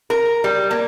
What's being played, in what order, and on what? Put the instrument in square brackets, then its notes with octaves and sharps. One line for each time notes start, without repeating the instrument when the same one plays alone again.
[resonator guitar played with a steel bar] A#4
G3
A#3